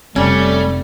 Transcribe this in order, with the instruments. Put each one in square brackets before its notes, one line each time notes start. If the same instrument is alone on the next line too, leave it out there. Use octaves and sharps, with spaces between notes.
[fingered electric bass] F1 C3 [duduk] G3 [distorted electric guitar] A3 [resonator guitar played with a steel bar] C#4